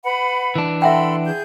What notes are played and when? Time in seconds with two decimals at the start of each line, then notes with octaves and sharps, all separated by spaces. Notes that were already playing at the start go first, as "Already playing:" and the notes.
0.04 B4 F#5 B5
0.56 E3 D4
0.82 A4 E5 F#5 G5 B5 C6
1.25 G#4 G6